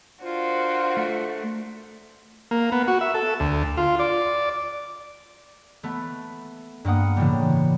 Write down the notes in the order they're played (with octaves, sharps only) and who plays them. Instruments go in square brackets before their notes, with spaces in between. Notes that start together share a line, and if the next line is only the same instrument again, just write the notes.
[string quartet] D4 F#4 A#4 [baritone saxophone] F4 [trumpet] C5
[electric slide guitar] A3
[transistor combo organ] A#3
B3
F#4
E5
A4
D2
F4
D5
[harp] A3 B3
G2 A#3 F#5 D#6
A2 C#3 E3 G3